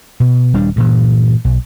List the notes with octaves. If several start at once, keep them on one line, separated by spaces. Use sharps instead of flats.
B2
D#1 G3 D4
G2 A#2 E3
B1